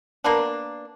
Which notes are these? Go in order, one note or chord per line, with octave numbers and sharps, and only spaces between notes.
A#3 B3 D4